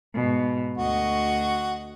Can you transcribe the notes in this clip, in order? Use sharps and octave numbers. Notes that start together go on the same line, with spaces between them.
G#2 B2
D2 F#4 D#5 C#6